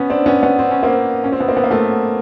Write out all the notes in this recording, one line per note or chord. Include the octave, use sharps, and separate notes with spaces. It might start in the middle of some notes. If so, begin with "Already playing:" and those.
Already playing: B3 C#4
C4 D4
B3 C#4
B3 C#4
C4
C#4
A#3 C4
C#4
C4
B3
A#3 C4
B3
A#3
A3 B3